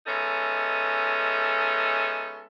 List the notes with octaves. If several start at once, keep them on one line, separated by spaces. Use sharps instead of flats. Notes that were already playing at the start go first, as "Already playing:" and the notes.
G#3 B3 C#4 D#4 A4 E5